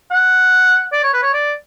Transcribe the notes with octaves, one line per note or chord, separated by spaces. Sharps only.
F#5
D5
C#5
B4
C#5
D5